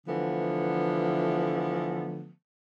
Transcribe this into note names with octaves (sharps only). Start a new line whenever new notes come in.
D3 E3 F3 A3 B3